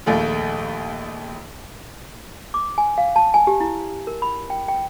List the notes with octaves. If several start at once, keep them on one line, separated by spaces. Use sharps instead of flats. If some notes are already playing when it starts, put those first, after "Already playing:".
A#1 D#2 A3 F4
D6
G#5
F5
A5
G#5
G4
E4
A#4
B5
G5
G5